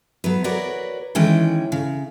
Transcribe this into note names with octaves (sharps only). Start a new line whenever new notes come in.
F#3 B3 B4
F#4 A#4 B4 C#5 D5
D#3 E3 G#3 C#4 G5
C#3